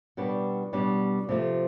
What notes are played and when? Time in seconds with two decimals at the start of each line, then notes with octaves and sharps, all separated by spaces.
0.17 B2 G3 B3 D4
0.73 B2 G3 B3 D4
1.29 C3 F3 A3